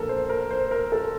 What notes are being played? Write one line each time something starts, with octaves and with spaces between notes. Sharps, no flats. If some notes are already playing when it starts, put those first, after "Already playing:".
Already playing: A#1 A#2 A4 A#4
C5
A#4
C5
A#4
A4